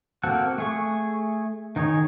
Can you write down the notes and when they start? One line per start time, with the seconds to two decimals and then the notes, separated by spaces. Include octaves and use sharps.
0.23 A#3 C4 F#4 A4 F#5
0.58 A3 G#4 C#6
1.76 D#3 D#4 G#4 C#5